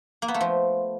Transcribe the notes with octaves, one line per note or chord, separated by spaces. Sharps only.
A#3
B3
A3
F3